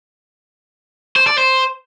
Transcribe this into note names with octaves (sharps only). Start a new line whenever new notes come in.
C5
D5
C5